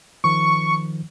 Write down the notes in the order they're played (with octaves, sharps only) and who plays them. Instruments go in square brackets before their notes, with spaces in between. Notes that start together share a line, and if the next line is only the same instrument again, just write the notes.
[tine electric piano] D#3 F3 [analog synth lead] C#6